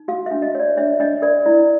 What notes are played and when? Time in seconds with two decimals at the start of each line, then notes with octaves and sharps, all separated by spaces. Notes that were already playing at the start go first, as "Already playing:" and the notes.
Already playing: D#4
0.08 F#4 F5
0.26 D4 E5
0.42 D#5
0.55 C#5 D5
0.77 D4 E5
1.00 D4 D#5
1.22 A#4 D5
1.46 E4 D5